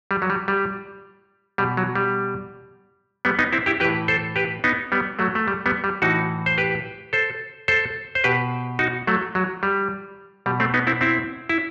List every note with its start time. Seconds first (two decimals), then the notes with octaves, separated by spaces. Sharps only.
0.11 G3
0.22 F#3
0.30 G3
0.48 G3
1.58 B2 G3
1.77 F#3
1.95 G3
3.25 G3 B3
3.39 B3 D#4
3.53 C4 E4
3.66 E4 G4
3.80 E3 G4 B4
3.85 A2
4.08 A4 C5
4.36 G4 B4
4.64 B3 D#4
4.92 G3 B3
5.19 F#3 A3
5.35 A3
5.48 G3
5.66 G3 B3
5.84 G3
6.02 A2 E3 D#4 F#4
6.46 C5
6.58 G4 B4
7.13 A4 C5
7.68 A4 C5
8.15 C5
8.24 B2 G4 B4
8.79 D#4 F#4
9.07 F#3 A3
9.35 F#3
9.63 G3
10.46 B2 G3
10.60 A3 C4
10.74 B3 D#4
10.87 C4 E4
11.01 C4 E4
11.49 E4